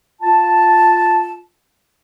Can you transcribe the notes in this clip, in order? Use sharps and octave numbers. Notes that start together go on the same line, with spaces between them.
F4 A5